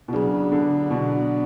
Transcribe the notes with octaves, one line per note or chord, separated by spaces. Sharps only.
B2
C#3 F#3 B3 D4
D3
B2